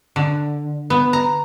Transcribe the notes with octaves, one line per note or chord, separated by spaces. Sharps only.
D3
B3
A#5